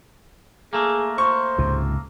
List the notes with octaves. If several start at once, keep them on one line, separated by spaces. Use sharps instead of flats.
A3 A#3 G#4
C5 C#6
C#2 G#2 C3